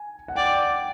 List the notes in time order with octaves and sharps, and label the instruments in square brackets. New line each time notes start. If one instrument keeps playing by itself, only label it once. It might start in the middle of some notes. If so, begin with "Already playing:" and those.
Already playing: [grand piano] G#5
F#5
[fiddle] D5 [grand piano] G5